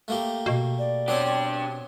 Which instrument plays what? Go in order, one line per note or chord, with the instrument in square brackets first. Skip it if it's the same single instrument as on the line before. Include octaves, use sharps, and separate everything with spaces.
[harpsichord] A3 A#3 G4
[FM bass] B2
[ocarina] D5
[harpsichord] B3 C4 C#5 [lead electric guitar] D4 G4